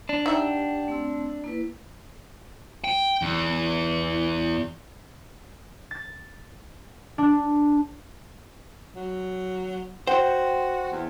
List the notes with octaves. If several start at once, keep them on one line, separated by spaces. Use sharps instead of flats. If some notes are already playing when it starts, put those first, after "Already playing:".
D4
D#4 G4 E5 F#5 G5
A3 C4 E6
A#3 E4 B4
G5
E2
A6
D4
F#3
F#4 C5 F#5 G5
E2